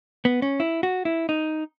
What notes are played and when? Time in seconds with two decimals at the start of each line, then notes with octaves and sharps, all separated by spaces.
0.25 B3
0.42 C#4
0.60 E4
0.83 F#4
1.05 E4
1.29 D#4